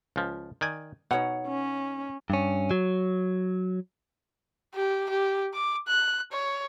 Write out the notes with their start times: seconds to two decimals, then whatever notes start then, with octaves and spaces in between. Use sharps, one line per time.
0.16 C#2 F3
0.61 D#3 D5 G#5
1.11 B2 D#4 C#5 F#5
1.47 C#4
2.30 G2 C#4
2.71 F#3
4.75 G4
5.10 G4
5.54 D6
5.88 F#6
6.33 C#5